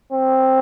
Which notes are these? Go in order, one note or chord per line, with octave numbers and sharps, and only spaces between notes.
C4